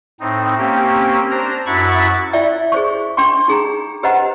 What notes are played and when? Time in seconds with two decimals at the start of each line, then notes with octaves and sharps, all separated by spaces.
0.20 A2 C4 D#4
0.58 A#3 C4 C#4 G4
1.31 D4 C5 A#5
1.66 F#2 E4 F#4 B5 C#6 A6
2.33 E4 D5 E5 G5
2.72 G#4 C5 C#6
3.17 D4 G5 C6 C#6
3.48 D#4 G#4 G5 A#5
4.03 G4 B4 C5 D#5 F#5 A#5